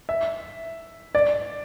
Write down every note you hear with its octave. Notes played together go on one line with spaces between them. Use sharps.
E5
D5